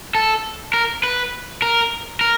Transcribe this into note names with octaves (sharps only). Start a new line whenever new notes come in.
A4
A#4
B4
A#4
A#4